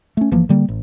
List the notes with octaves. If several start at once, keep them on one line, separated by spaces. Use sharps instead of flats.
A3 C#4
G1 E3 F3 A#3
D3 G3 A#3
A1